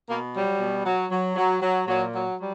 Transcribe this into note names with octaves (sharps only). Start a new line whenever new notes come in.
B2 A#3
F#3 G3
B2
F#3
F#3
F#3
F#3
A#2 F#3
F#3
F#3 G3